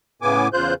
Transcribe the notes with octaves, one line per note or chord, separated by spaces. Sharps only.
A2 C#3 B3 G#5 D6
E2 C#3 F4 C5 F#6 G6